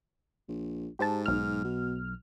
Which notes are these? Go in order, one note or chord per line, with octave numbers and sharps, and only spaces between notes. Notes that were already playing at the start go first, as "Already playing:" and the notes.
A#1
G#2 G4 C5 A5
B1 F6
B2